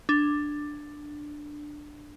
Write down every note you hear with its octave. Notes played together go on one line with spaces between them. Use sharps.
D4